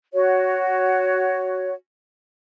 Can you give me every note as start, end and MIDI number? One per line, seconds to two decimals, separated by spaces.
0.13 1.73 66
0.13 1.73 73